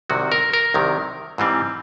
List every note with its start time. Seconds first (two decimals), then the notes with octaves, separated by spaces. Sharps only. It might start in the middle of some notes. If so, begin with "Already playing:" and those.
0.10 C2 C3 D#3 F#3 F#4
0.32 A#4
0.53 A#4
0.74 C2 C3 D#3 F#3
1.38 G#2 E3 G3 C4